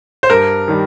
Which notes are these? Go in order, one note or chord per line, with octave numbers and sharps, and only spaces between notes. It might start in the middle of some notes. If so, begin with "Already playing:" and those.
C5
G2 A#4
D#3 G3